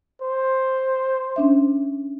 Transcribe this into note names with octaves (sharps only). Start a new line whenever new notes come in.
C5
C#4 D4 E5